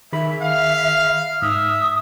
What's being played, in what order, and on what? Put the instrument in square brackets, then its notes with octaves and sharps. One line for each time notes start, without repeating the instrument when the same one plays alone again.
[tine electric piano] D#3 G#4 B5 [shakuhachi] E5
[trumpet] F5
[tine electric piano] G#2 F6 [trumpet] E5 [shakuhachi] D#6